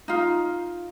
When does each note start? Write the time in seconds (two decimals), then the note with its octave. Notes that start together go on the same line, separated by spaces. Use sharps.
0.08 D#4 F4